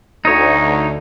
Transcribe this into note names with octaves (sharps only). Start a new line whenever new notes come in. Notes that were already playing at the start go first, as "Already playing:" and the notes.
D2 D#4 C#5